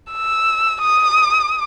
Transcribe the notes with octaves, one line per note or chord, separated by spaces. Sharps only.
E6
D#6